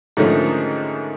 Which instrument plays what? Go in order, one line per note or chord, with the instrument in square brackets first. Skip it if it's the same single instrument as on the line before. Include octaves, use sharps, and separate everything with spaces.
[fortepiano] G#2 D3 D#3 F3 A3 C#4